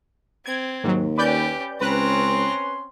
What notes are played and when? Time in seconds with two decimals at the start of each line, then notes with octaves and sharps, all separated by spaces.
0.46 C4 G#6
0.84 D#2 G#2 F#3
1.18 C#4 G4 B4 D5 G6
1.81 C#2 C4 C#4 B4 A#5 C6 F#6